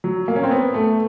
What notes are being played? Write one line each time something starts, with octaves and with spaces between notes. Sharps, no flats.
F#3
A#3
C#4
C4
B3
A3